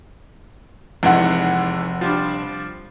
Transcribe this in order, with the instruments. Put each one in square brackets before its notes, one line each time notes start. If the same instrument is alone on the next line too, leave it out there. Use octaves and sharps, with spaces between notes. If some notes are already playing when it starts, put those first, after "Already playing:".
[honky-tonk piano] F1 F#5 [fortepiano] E2 G#2 G#3
[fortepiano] F3 G3 D4